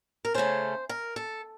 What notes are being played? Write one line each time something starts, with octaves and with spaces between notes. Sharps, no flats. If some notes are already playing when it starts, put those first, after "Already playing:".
A#4
C#3 A3 C#4 C5
A#4
A4